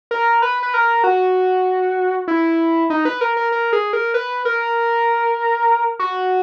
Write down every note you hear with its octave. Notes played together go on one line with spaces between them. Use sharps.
A#4
B4
B4
A#4
F#4
E4
D#4
B4
A#4
A#4
A#4
G#4
A#4
B4
A#4
F#4